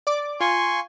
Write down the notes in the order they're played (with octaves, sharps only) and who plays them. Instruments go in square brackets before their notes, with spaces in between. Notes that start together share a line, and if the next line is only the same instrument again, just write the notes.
[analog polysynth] D5 D6
[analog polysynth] F4 [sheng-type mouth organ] G#5 C6 C#6